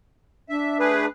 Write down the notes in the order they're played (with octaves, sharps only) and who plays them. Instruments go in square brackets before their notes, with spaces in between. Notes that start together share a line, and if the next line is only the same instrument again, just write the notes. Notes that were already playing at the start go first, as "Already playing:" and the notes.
[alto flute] D4 [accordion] E5
[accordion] A3 G#4 B4